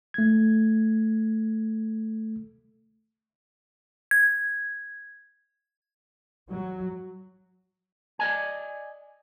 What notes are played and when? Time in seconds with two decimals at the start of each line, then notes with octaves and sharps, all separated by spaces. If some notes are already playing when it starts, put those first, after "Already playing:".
0.14 A3 G#6
4.11 G#6
6.50 F#3
8.19 D5 D#5 G#5